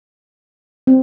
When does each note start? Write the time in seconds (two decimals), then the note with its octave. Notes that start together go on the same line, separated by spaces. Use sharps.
0.87 C4